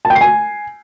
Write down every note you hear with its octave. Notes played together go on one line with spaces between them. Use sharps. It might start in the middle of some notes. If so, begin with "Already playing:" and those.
A5
G5
C7
G#5